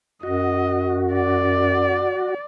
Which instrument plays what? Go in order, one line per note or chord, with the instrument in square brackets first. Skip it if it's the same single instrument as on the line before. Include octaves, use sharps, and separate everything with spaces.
[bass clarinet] F#2 [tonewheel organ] F#4 [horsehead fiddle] D#5
[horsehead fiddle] D5